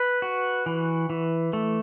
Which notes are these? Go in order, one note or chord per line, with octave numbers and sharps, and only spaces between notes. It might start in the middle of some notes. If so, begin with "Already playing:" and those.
Already playing: B4
F#4
E3
E3
A3